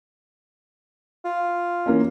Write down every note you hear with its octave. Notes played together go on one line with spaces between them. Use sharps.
F4
E3 A#3 C#4